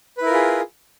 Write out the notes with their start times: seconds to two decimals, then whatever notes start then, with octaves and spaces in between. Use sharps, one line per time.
0.17 B4
0.22 E4
0.26 A#4
0.30 F4
0.34 G#4